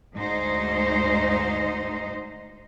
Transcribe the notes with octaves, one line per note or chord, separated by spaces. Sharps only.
D2 G#2 D#4 C5